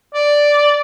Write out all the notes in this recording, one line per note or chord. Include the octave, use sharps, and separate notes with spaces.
D5